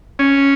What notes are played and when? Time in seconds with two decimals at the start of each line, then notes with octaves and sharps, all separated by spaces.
0.19 C#4